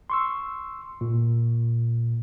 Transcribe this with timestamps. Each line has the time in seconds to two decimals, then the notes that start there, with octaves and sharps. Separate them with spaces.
0.10 C6 C#6 E6
1.01 A#2